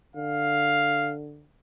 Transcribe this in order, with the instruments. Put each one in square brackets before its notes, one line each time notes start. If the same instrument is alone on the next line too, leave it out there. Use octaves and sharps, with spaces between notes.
[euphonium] D3 [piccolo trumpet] F5